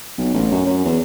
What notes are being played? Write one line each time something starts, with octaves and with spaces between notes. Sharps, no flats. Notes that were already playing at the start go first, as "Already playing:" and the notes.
B1
A1
F#2
F#2
E2